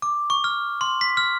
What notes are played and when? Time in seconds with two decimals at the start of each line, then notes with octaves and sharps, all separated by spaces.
0.02 D6
0.30 C#6
0.44 F6
0.81 C6
1.01 B6
1.17 F6